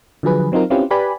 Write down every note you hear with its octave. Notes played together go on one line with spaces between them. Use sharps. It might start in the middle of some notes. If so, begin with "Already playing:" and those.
D3 F3 F#3 G#4 B4
F#3 C4 D#4 F4 A#4
C4 C#4 E4 F4 G4 B4
G4 B4 D5 G#5 B5